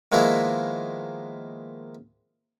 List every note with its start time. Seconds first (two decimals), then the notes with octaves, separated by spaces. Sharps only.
0.12 D#3 F3 G#3 A#3 B3 E4